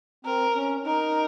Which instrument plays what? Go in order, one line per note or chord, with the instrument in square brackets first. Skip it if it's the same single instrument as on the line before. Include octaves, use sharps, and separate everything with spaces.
[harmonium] C4 [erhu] A#4
[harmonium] C#4
[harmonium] D#4 [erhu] A#4